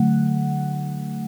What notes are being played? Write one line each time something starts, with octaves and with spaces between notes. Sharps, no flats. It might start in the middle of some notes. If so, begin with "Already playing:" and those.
Already playing: D3 F#3 A3 F#5